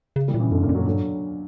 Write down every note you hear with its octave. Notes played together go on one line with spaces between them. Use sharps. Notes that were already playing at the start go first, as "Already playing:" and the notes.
C#3
E3 G3
A#2
C#3 E3
F#2 B2 D3
A#2 C#3
F#2
D3 F#3
G2 D3 F#3